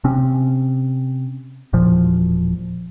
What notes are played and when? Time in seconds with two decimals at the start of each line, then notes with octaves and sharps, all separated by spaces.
0.04 C3 C4 C#4
1.73 E1 A#2 F3